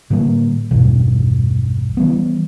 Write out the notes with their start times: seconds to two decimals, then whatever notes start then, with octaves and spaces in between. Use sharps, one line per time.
0.10 A2 D3 G3 A#3
0.71 A#1 E2 G2 B2
1.97 E3 G3 B3